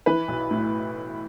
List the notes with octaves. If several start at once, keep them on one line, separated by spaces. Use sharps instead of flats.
E3 B4
B1
A2